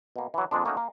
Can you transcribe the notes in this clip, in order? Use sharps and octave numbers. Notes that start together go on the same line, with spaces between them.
B2 A#3
E3 F#3
F2 A#2 G#3 D4
A3 A#3 C#4 D#4 F#4
A#3